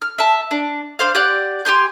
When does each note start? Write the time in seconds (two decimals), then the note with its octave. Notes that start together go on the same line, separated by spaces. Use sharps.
0.02 F6
0.18 E5 A5
0.51 D4
0.99 D4 C5 F5
1.15 G4 D5 F#5
1.65 G4 G#5 C6 G6